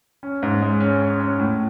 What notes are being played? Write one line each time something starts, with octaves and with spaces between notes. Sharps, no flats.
C#4
G#2
G#3
C#4
C#4
C#4
A2